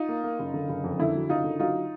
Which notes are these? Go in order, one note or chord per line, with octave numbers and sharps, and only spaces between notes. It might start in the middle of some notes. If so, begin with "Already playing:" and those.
Already playing: D#4 F4
A#3
A#3
F#1
D3
F#1
F2
D3 E4
F#3
F#1 D#4 F4
D3
F#3 D#4 F4